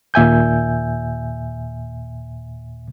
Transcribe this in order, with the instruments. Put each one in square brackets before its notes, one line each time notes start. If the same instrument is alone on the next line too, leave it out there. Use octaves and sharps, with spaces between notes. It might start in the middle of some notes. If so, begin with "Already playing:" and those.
[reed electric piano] D#2 A#2 E5 G#5 G6